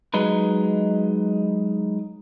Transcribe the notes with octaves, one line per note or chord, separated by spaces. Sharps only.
F#3 G#3 D#4 B4